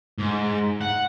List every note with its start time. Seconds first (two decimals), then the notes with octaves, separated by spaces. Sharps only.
0.18 G#2
0.81 F#5